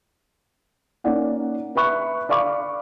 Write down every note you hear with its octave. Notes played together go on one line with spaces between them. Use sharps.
A#3 C#4 D#4 D5 F#5
B4 E5 B5 C#6 F#6
D5 F5 B5 C#6 D6